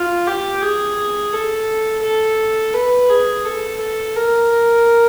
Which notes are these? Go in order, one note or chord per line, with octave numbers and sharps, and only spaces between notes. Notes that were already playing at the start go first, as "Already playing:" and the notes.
Already playing: F4
G4
G#4
A4
A4
B4
G#4
A4
A4
A#4